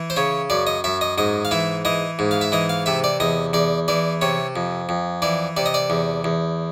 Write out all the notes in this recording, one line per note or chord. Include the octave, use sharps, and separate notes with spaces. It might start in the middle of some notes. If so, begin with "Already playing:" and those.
Already playing: E3
C5
C#3 C#5
F#2 D5
D#5
F#2 E5
D#5
G#2 D#5
F5
E3 E5
E3 D#5
G#2
F5
E5
E3 D#5
F5
C3 E5
D5
E2 D#5
E2 D5
E3 D5
C3 C#5
F2
F2
E3 D5
C3 D5
D#5
D5
E2
E2